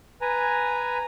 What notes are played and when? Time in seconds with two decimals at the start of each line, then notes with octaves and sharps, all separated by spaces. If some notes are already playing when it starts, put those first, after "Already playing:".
0.21 B4 G#5 A#5